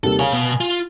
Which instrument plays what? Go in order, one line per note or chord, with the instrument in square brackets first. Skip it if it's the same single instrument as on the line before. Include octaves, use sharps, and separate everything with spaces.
[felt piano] D#2 C3 G3 [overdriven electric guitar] A4
[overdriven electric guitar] G#4 C#5 [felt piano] F5 G#5
[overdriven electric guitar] B2 B3
F4